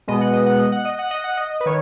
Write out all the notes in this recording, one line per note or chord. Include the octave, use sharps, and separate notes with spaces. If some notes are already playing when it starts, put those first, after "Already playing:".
B2 G#3 B3 D#5
F#5
D#5
F#5
D#5
F#5
D#5
F#5
D#5
F#5
D#5
B4
D#3 C#5